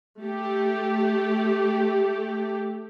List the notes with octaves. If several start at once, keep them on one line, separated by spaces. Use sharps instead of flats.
A3 G4